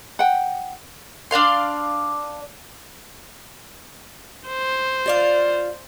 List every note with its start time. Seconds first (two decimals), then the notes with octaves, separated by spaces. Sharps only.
0.19 F#5 G5
1.31 D4 D5 F5 C6
4.48 C5
5.06 F4 D5 F5